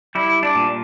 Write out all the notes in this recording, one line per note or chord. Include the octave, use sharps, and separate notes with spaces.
G3 E4
D4
A#2